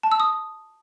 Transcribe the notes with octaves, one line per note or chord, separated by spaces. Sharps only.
A5
E6
D#6